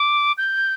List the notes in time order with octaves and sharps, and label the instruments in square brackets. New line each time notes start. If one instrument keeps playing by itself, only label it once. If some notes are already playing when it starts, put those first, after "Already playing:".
Already playing: [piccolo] D6
G6